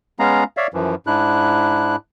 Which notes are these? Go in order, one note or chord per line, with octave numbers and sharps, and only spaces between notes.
G#3 B3 C#4 F5 A#5
C#5 D5 E5 F5
F#2 E3 F3
G#2 D4 E4 F#6